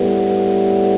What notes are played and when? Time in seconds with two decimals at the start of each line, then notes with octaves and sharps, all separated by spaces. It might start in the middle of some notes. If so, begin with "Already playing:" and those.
Already playing: A2 G3 B3